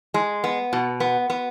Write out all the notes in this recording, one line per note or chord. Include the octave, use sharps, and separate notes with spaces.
G#3
B3
B2
B3
B3